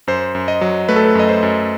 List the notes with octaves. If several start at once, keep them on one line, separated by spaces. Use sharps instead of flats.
F#2 C5
F#2
D#5
F#3
A3 B4
A4
B4
F#2 D#5
C5
F#2